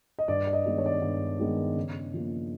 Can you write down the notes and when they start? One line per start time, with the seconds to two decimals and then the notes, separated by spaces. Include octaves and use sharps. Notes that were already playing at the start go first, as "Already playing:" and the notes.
0.19 D#5
0.28 G2 D5
0.47 D5
0.53 D#5
0.66 D#3 G#3 B3
0.78 C#5
0.86 D5
0.94 C#5
1.02 G2
1.40 D#3 G#3 B3
1.76 C#3
2.14 F3 A#3